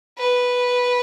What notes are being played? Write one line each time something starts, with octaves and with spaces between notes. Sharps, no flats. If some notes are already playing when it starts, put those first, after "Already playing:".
B4